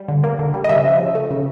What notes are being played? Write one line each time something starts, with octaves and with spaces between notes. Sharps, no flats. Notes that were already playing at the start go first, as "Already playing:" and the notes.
Already playing: G3
D3
A#3
D3
G3
D#5
C#3 E5
F3
C#3
A3
C#3